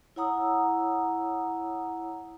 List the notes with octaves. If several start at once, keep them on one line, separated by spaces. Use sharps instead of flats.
E4 C#5 F#5 A#5 D#6 E6